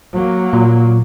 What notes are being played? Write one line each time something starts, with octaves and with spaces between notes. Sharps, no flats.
F#3 A#3
A#2